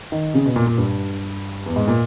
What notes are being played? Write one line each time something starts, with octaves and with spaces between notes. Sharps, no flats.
D#3
C#3
B2
A#2
A#2
G2
E2
G#2
A#2